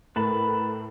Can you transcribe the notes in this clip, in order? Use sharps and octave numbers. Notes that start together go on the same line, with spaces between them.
A2 A#4 B4 A5 B5